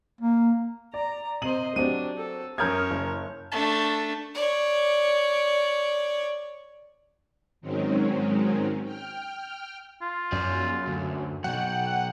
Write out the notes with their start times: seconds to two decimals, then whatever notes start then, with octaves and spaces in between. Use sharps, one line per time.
0.21 A#3
0.94 D5 A#5
1.42 C3 C5 D#5 D#7 F#7
1.76 F#3 C4 D4 G4 D#7
2.17 A4
2.58 F#2 A#4 C#5 D#6 F6 G6 G#6
2.91 F#1
3.52 A3 D4
4.35 C#5 D5
7.61 G#2 D#3 F#3 G#3 C4 C#4
8.83 G5 F6
10.01 F4
10.32 F#2 G#4 D5
10.87 D2
11.44 B2 F#3 F#5 G5